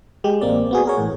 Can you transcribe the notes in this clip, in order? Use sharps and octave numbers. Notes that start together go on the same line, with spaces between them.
G#3 G4
A1 A#3 C4 D5
B3 F#4 G#4
G#4 A#4 C#5
A1 A2